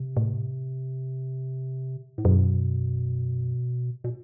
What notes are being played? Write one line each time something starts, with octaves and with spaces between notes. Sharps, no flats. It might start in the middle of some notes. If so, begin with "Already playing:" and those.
Already playing: C3
A2
A2
F#2 B2
B2